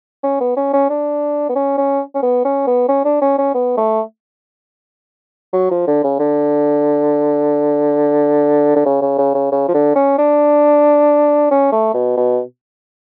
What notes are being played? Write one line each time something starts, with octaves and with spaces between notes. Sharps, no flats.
C#4
B3
C#4
C#4
D4
B3
C#4
C#4
C#4
B3
C#4
B3
C#4
D4
C#4
C#4
B3
A3
F#3
F3
D3
C#3
D3
D3
C#3
C#3
C#3
C#3
C#3
F3
D3
C#4
D4
C#4
A3
B2
B2